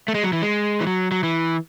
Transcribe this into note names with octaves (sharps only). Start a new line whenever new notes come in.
A3
G#3
F#3
E3
G#3
E3
F#3
F#3
E3